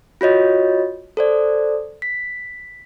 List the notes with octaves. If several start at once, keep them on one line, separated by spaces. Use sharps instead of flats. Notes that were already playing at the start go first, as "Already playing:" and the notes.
F4 F#4 C#5 D#5
A4 C5 D5
B6